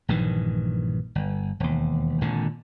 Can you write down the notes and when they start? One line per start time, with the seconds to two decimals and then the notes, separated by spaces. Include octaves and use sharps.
0.08 A#1 G2 D#3 E3
1.15 G1
1.60 E1 D#2
2.21 G#1 A#2 D3